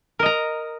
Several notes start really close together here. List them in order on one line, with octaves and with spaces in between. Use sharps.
A#4 D#5 A#5